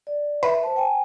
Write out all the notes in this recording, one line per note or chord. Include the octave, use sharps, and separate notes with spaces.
D5
B4 E5
C5 A5
G5 G#5